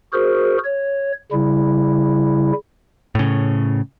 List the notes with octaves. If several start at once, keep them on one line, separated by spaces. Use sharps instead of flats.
F#4 G#4 A#4 C5
C#5
C#3 G3 E4
A2 C#3